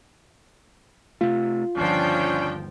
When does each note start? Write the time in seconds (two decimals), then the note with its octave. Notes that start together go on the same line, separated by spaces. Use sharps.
1.21 C3 A3 F4
1.76 G1 D#2 F3 C#4 D4 G5